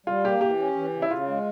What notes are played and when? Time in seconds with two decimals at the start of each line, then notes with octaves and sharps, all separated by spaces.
0.06 G3 F4
0.24 A#3 G4
0.41 E3 G4
0.58 C#4
0.75 E3
0.93 C#3
1.02 E4
1.10 C#3 F4
1.28 G#3